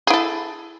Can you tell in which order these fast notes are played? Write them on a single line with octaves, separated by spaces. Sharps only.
G#4 E4 A4